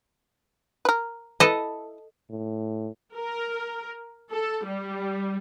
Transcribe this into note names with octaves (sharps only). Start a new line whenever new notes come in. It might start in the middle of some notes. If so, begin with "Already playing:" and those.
A#4 B4
E4 A4 B4 D#5
A2
A#4
A4
G3